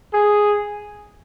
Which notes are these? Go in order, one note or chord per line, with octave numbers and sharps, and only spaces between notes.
G#4